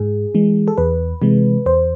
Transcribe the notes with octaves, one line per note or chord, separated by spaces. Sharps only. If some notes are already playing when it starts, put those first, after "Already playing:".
Already playing: G#2 G#4
E3 G#3
A4
E2 B4
C3 E3 G#3
E2 C5